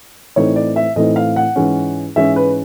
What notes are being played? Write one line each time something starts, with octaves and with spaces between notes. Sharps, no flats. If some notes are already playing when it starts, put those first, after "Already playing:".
A2 E3 A3 C4 D#4 C#5
D5
E5
A2 E3 A3 C4 D#4 D#5
F5
F#5
G#2 E3 G#3 C#4
G#2 E3 G#3 C#4 E5
B4